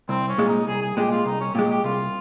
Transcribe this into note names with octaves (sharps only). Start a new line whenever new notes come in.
C2 C4
C#4
A#2 G#3
D#4
C2 G#4
G#4
A#2 G#3 G4
F4
C2 D#4
C#4
A#2 G#3 G4
G4
C2 F4